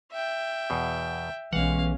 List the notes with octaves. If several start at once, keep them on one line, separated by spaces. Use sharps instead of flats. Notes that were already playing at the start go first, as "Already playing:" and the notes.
E5 G5
E2 B2
B1 E3 G#3 C#4 F5 F#5